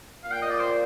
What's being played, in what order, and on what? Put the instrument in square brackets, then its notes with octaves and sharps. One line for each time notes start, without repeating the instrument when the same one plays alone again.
[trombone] A#2 [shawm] F5
[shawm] G5
D#5
D5
C5